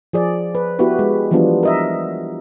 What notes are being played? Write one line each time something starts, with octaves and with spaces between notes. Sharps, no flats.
F3 G#4 D5
B4
B3 E4 F#4 G4 B4
G#3
E3 F3 G3 B3 D4 F4
A#4 D#5 E5